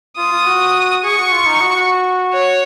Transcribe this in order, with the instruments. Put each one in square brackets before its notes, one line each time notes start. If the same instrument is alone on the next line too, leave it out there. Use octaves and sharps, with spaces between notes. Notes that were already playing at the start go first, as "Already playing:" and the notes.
[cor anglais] F4 [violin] D#6
[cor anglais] F4
F#4
[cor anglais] G#4 [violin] C#6
[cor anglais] F#4
F4
D#4
F#4
F#4
[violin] C#5